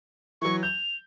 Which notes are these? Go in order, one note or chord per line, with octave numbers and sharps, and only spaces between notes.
E3 F#3 C#6
G6 F7